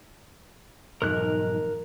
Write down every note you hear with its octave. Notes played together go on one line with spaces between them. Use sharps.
B1 F2 G#2 E3 A#4 F#6